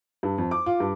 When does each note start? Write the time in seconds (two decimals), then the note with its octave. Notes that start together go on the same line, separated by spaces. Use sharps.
0.23 G2
0.38 F2
0.51 D6
0.66 F4
0.80 G2